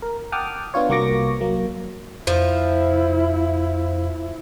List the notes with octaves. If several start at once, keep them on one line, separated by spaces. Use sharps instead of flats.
A#4
F#5 G5 A5 D6 D#6 F6
B3 D4 F4 C#5
C2 A#3 F#4 C#6 D6 A#6
F#3 A#3
F2 F3 E4